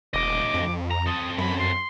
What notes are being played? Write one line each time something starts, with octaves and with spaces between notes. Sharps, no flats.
E1 D2 D#5 D6
F2
A#5
C4 A4 D#6
F#2 B5
C6